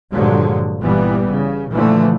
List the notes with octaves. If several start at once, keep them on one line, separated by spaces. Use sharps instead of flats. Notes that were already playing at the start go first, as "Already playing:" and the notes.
G2 A#2 D3 F3 F#3 G#3
G1 A#2 E3 G3 B3
C#3
A#2 D3 E3 F3 A3